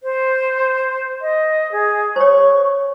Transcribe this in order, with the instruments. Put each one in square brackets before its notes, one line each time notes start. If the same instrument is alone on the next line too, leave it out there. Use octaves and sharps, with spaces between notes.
[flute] C5
D#5
G#4
[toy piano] C5 C#5 [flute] C#6